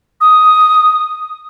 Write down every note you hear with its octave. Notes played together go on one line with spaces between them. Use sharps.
D#6